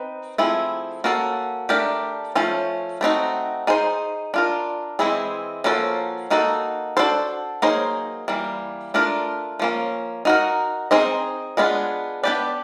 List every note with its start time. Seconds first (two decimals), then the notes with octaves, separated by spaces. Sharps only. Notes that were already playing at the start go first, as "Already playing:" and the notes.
Already playing: C4 D#4 B4
0.38 F3 A3 C4 E4 G#4
1.04 A#3 C#4 F#4 A4
1.69 A3 D4 G4 A#4
2.35 F3 A3 C#4
3.01 A3 C4 D#4 F#4
3.67 D#4 G#4 C5
4.34 D4 F4 A#4
4.99 E3 G#3 C4 E4 G#4
5.64 F3 A#3 C#4 F#4 A4
6.30 A#3 D#4 F#4 A4
6.97 D4 F#4 A4 C5
7.62 F#3 A#3 D#4 G#4 C5
8.28 E3 G3 A#3
8.94 A3 D4 F4 A#4
9.59 F3 A#3 C#4
10.25 D#4 F#4 A#4
10.91 C4 D#4 G#4 C5 D#5
11.57 G#3 B3 D4 F4 G#4
12.23 B3 D4 G4 B4 D5